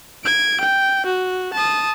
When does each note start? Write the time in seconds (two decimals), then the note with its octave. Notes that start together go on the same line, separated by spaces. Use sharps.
0.24 G#6 D7
0.60 G5
1.05 F#4
1.53 A5 D#6